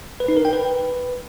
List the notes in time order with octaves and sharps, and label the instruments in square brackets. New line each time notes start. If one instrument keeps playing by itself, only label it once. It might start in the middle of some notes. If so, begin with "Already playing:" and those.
[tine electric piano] B4
D#4
A#4
G5
B4